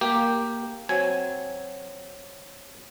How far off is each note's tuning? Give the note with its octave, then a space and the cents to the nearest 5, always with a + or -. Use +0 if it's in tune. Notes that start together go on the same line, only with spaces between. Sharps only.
A#3 +0 G4 +0
F#3 +0 C4 +5 G#5 +0